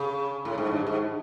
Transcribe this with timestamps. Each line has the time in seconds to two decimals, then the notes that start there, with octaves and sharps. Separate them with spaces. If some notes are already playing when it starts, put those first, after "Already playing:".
Already playing: C#3
0.45 A2
0.58 G#2
0.72 G2
0.87 G#2